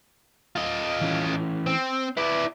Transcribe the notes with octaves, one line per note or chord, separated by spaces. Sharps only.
F4 D#5
E3 C#4
C4
E4 B4 D5